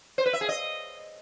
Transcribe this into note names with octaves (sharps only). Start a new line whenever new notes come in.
C5
B4
E5
G#4
D#5